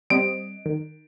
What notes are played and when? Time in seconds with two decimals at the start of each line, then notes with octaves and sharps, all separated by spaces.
0.10 G3 C4 D#5 D7
0.66 D#3